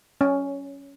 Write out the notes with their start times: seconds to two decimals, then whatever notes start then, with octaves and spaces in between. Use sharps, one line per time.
0.21 C#4